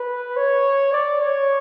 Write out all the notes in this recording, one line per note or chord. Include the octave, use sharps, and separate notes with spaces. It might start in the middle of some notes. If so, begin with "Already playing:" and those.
Already playing: B4
C#5
D5
C#5